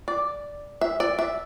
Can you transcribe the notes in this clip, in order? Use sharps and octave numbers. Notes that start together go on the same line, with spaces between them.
D5
E5
D5
E5